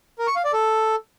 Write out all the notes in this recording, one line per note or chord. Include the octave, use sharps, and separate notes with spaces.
A#4
C#6
F5
D5
A4